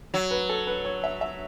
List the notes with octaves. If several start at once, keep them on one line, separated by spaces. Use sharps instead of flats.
F#3
B4
A4
B4
C#5
E5
E5